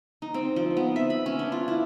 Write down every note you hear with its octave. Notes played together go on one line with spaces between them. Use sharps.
D#4
C4
F3
B3
E5
B5
C#4
D4
F4
E4